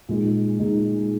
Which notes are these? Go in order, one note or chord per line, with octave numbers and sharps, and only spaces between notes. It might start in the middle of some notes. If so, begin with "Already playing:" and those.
A#2 G#3 D#4 G#4
A#2 G#3 D#4 G#4